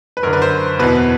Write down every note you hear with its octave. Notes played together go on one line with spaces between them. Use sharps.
B4
F#2 D3 A#4
B4
C5
E2 B2 B4